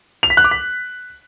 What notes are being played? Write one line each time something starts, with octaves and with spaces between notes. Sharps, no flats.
F7
B6
F#6
D6
B6